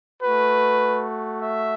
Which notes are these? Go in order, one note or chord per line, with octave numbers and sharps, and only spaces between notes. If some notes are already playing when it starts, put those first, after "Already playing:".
A3 F#4 B4
E5